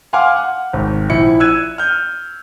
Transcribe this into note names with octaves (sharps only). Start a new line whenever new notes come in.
F5 F#5 G#5 C6 D6 F6
F#5
G#1
A#1 E4 C#7
E6 F#6 G#6 D#7
F6 G6